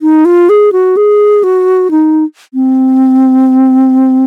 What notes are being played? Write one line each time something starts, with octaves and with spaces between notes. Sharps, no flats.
D#4
F4
G#4
F#4
G#4
F#4
D#4
C4